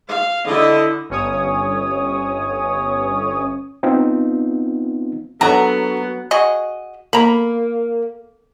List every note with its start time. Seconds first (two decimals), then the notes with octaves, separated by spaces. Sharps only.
0.11 F5
0.48 D3 E4 D#5
1.10 G1 C#4 C#5 D#6
3.83 B3 C4 D#4 F4
5.41 F#3 B3 D4 A4 C#5 A#5
6.31 F#4 G#4 D#5
7.13 A#3 A#5 B5